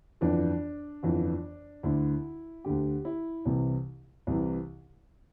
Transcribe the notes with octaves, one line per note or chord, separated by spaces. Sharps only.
G1 F2 E3 D4
G1 F2 E3
D2 D3 E4
D2 D3 G4
E4
C2 C3 E3
C2 C3 E3